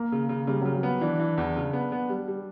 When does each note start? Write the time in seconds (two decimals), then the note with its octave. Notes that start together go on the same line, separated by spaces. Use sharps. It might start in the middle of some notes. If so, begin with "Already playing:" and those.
Already playing: A#3
0.12 C#3
0.29 C#3
0.47 C#3 G3
0.61 C#3 F#3
0.75 G3
0.83 B3
1.01 E3 D4
1.19 E3
1.38 E2
1.56 C#3
1.73 B3
1.92 B3
2.09 G3
2.28 G3